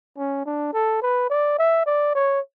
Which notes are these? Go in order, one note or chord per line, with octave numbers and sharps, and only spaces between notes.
C#4
D4
A4
B4
D5
E5
D5
C#5